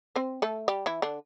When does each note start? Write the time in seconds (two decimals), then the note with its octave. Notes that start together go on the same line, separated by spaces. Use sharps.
0.16 C4 C5
0.42 A3 A4
0.68 G3 G4
0.86 E3 E4
1.02 D3 D4